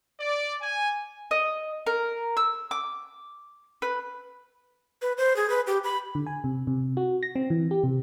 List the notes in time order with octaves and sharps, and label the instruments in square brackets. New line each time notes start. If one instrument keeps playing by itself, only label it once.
[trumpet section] D5
G#5
[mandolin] D#5
A#4
E6
D6
B4
[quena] B4
C5
G#4
B4
G4
B5
[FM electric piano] D3
G#5
C3
C3
F#4
A#6
C4
E3
G4
C3